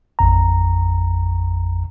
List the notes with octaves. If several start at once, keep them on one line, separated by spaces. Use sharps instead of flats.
A1 F2 A#5